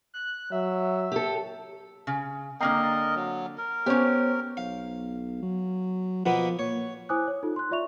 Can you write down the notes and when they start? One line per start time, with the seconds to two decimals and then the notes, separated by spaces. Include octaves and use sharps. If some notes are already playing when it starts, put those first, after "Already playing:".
0.14 F#6
0.52 F#3 E5
1.12 G4 A4
2.07 C#3
2.61 D3 A#3 C4 A#4 D#5 G5 A#5 C7
2.83 A6
3.15 F#3
3.58 A#4
3.86 B3 C#4 G4 C5 C#5
4.57 B1 F5
5.42 F#3
6.26 B2 F3 A#3 B3
6.59 A#2 C#5
7.09 E4 C5 G#5 D6 D#6 F#6
7.28 C#5
7.43 D#4 F4 A4
7.56 C6 F#6
7.71 F4 D5 E5 C#6 F7